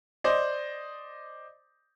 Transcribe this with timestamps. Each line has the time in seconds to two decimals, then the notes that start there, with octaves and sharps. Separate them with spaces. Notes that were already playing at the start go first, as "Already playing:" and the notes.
0.24 C5 D5 D#5